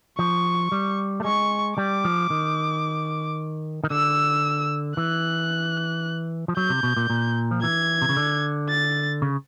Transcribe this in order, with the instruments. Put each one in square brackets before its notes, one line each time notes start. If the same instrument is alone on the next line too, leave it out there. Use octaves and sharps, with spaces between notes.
[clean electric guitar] F3 [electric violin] C#6
[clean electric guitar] G3
A3
[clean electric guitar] G#3 [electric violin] C#6
[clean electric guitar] G3 [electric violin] D6
[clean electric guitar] F3
D#3
D#3
[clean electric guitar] D3 [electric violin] E6
[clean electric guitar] E3 [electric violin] F#6
[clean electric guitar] F3
[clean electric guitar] F#3 [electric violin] G6
[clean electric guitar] C3
B2
A#2
A#2
F3
[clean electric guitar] E3 [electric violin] G#6
[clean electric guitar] C3
C#3
D3
[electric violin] A6
[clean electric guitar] C#3